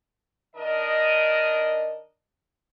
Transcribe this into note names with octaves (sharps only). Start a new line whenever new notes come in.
D#3 D4 A#4 D#5